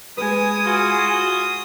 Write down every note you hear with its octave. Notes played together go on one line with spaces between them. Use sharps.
G#3 B4 G#5 D#6
F4 F#4